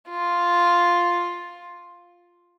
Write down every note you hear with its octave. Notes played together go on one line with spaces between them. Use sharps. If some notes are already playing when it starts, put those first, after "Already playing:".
F4